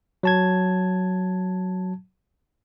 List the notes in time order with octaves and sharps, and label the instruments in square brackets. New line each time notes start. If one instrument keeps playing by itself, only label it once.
[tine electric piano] F#3 A5 G#6